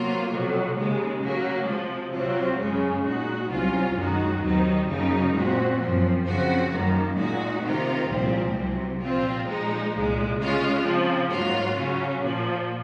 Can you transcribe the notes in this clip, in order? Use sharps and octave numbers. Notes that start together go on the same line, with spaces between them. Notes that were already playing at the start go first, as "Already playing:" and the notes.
Already playing: C3 F#3 A#3 F4
F2 C3 F#3
D#2 C#3 G#3
C#3 F#3 A#3
C3 F3 G#3
C3 F#3 C4 F4
F#2 C#3 G#3 C#4
A#2 G#3 D#4 F#4
C2 C3 F#3 C#4 F4
F#2 D#3 G#3 D#4 F#4
D#2 D#3 F#3 C4 D#4
F#2 C#3 F#3 A#3 D#4
A#2 G#3 C4 F#4
F#2 F3 C4
C#3 F3 C4 F#4
F#2 D#3 A#3
A#2 G#3 D#4 F#4
C3 D#3 A#3 F4
C2 A#2 F3 G#3 C4
C2 C3 F#3
A#2 F3 C4 F4
A#2 F3 G#3 D#4
C2 A#2 G#3
C#3 G#3 C#4 F4
C#3 F3 C4
G#2 F#3 A#3 F4
C#3 F#3 C#4
A#2 F3 A#3